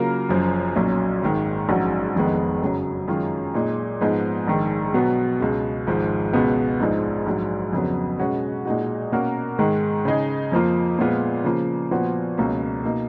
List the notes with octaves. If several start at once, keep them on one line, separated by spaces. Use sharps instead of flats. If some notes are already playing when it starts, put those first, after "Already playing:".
Already playing: C#3 F#3 A#3 F4 A#4
F#1 F#2 F3
B1 A#2 F#3 C#4
G#1 G#2 D#3 G#3
A#1 G#2 F#3 C#4 F#4
F1 F2 D#3 G#3 B3
F#2 C#3 F#3
F#2 D#3 G#3 C#4 F4
A#2 G#3 D#4
G#2 F3 B3 D#4 G#4
A#1 G#2 D#3
B2 F#3 B3
C#2 B2 G#3
G#1 G#2 F3 G#3
C#2 B2 G#3 B3
A#1 G#2 F3 G#3 D#4
A#1 G#2 F#3
F2 C#3 F#3 B3
B2 G#3 C#4 F#4
A#2 G#3 D#4 F#4
B2 A#3 C#4 F#4 A#4
G#2 D#3 G#3
C#3 G#3 D#4 G#4
F2 F3 A#3 F4
A#2 F3 G#3 B3 F4
C#3 F3 A#3 F4
A#2 F3 B3 F#4
C#2 B2 A#3 C#4
B2 A#3 D#4